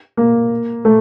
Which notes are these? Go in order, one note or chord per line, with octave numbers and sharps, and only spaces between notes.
A#3
A3